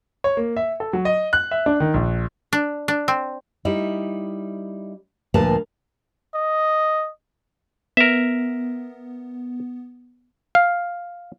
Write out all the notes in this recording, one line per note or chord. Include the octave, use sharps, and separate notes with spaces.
C#5
A#3
E5
A4
F#3
D#5
F#6
E5
D4
D#3
A#1
D4
D4
C4
G3 D#4 E4
D2 A#2 F3 A#4 B4 A5
D#5
B3 A#4 E5
F5